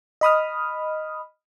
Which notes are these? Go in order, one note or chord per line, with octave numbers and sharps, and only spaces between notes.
D#5 B5 D#6 F6